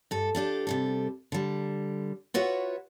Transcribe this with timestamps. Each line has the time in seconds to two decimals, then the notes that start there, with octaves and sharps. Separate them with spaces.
0.11 G2 A4
0.35 F3 D4 G4 A4
0.67 C3 G3 A4
1.32 D3 G3
2.34 F4 F#4 B4 C#5 E5 F#5